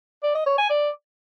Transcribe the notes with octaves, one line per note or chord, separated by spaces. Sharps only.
D5
D#5
C#5
G#5
D5